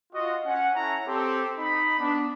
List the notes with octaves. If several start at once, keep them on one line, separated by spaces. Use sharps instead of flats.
F4 F#4 D#5
C#4 F#5
C#4 E4 A4 C#5 F#5 A#5
C4 G4 A4
D#4 B5
B3 D4